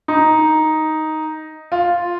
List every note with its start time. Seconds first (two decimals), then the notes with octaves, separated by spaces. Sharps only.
0.08 D#4
1.72 F4